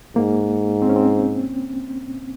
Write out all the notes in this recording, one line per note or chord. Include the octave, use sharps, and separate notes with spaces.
G#2 A#3
C4
C#4
C4